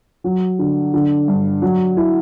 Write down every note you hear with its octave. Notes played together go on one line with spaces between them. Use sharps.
F#3
D3
D3
G2
F#3
E4